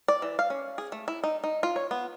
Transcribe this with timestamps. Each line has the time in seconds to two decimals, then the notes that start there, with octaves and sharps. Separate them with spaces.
0.08 D5
0.22 E3
0.39 F5
0.50 C#4
0.78 G#4
0.92 A3
1.08 E4
1.24 D#4
1.44 D#4
1.63 F4
1.76 C#5
1.91 B3